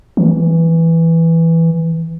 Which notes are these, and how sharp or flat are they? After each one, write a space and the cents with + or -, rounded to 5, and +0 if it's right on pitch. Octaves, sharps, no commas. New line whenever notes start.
E3 +0